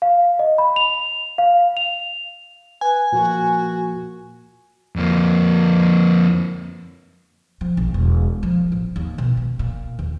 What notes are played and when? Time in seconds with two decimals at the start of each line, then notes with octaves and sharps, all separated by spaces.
0.02 F5
0.39 D#5
0.58 B5
0.76 F7
1.38 F5
1.77 F7
2.81 B4 G#5
3.12 A#2 F3 A#3 F#4
4.96 F2 A#3
7.61 F3
7.77 A#1
7.94 E1
8.43 F3
8.72 A1
8.96 D#2
9.18 B2
9.37 B2
9.59 A#2
9.99 D#2